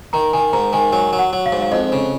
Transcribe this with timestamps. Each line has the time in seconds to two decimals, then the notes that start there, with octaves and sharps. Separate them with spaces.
0.13 D#3 A#5
0.33 D#3 G#5
0.53 G#2 A#5
0.73 D#3 G#5
0.92 F#3 G#5
1.13 F#3
1.19 F#5
1.33 F#3
1.46 F5
1.52 G#2
1.62 F5
1.72 F2 D#5
1.92 C#3